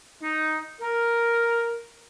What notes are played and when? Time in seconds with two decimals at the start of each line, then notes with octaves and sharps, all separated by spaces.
0.22 D#4
0.80 A#4